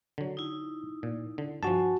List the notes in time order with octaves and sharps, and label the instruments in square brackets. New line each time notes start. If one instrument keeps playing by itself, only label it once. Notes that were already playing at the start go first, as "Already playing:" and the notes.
[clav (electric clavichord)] D3 F#3
[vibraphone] D#4 E4
[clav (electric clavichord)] A#2
D3
[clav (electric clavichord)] G2 F3 [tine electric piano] F#4 A5 [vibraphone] G#5